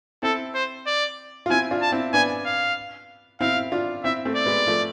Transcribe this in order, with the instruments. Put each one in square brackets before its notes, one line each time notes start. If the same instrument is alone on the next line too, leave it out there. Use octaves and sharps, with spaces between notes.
[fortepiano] C4 E4 [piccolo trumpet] A4
[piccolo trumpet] C5
D5
[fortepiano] F4
[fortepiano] C4 E4 [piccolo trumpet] G#5
[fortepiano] D4 F4
[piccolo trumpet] A5
[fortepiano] C4 E4
[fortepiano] B3 D4 [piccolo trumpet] G#5
[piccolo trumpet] F5
[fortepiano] C4 E4 [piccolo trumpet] F5
[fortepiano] D4 F4
[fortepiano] C4 E4 [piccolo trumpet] E5
[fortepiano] A3 C4
[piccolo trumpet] D5
[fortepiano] G#3 B3
F3 A3